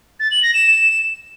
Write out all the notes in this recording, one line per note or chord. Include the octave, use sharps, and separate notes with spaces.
A6
F#7
A#6
E7